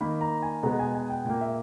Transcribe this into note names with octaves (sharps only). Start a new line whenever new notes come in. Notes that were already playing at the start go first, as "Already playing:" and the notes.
D#3 A#3 B5
A#5
G#5
B2 G#3 B3 A#5
G#5
G#5
G5
A#2 A#3 G5
E5